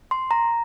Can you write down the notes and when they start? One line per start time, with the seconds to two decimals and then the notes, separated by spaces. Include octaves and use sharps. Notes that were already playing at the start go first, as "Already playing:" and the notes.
0.11 C6
0.31 A#5